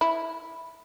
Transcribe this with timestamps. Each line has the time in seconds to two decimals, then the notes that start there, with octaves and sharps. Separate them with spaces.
0.01 E4